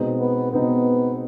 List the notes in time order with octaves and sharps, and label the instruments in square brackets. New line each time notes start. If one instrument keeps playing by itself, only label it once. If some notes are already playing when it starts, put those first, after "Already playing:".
Already playing: [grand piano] B2 G#3 C4 D#4
[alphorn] B3
[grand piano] B2 G#3 C4 D#4 [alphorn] B3